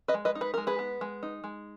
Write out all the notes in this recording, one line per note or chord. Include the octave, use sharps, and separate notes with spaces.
B4 D#5
G#3
B4 D#5
D#4
B4
G#3 A#4
G#4 B4
B3
G#3
D#4
G#3